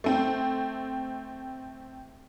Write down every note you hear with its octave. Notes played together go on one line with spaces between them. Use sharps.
A3 C4